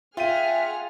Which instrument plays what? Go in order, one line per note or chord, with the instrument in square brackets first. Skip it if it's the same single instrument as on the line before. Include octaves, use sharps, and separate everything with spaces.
[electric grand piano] F4 D#7 [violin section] G#4 F#5 F6 [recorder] E5 [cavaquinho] G5